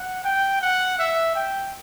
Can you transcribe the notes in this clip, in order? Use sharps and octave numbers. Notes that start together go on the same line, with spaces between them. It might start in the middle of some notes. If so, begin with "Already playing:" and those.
Already playing: F#5
G5
F#5
E5
G5